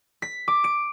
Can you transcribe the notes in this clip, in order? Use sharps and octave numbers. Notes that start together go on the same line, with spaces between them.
B6
D6
D7